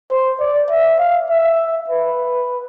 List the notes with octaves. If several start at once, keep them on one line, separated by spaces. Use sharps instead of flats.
C5
D5
E5
F5
E5
B4